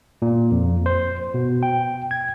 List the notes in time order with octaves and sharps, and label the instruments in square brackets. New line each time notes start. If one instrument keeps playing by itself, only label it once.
[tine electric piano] A#2
F2
C5
B2
G5
G#6